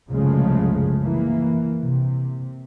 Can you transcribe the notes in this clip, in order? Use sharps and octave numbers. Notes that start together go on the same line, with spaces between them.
C2 F#2 C#3 F3 G#3 A3
E3 A#3
C3